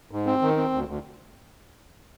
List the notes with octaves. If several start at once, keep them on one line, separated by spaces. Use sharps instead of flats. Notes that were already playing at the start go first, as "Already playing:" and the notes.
G#2
C4
D#3
C4
D2
D2